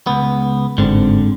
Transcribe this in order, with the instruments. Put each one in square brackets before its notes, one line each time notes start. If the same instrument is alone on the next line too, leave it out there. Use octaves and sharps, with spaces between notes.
[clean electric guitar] C#2 B3
[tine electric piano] G1 C4 [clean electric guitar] G#2 D3